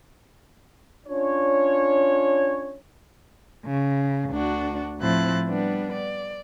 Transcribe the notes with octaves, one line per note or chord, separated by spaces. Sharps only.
C#4 D4 F4 C#5
C#3
D2 D4 F#4
A2 F3 C4 E4 F#6 A6
G3 B3 D4
D5